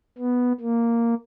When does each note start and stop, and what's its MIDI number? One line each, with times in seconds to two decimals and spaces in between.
0.18 0.52 59
0.60 1.14 58